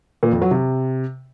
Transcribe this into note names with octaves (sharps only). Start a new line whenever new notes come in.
A#2
F2
F#3
C3